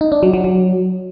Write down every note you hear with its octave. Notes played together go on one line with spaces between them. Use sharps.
D#4
D4
F#3
F#3
F#3